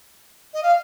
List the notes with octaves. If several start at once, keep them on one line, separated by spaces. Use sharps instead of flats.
D#5
F5